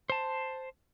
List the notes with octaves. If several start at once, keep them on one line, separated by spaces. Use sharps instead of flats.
C5 A5